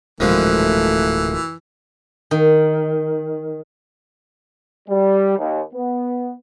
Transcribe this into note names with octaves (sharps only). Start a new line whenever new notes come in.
D1 A#1 B2 E3 F3 G#3 A3
D#3
G3
D#2
B3